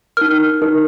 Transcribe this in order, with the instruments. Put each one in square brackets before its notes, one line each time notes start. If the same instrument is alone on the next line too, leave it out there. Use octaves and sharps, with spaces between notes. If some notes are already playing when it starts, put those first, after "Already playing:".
[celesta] D#4 A#4 F6
D#4 A#4